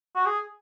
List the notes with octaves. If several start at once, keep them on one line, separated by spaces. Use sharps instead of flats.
F#4
G#4